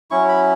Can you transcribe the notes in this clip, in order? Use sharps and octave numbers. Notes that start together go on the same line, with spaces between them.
F#3 C#4 E4 C#6
B5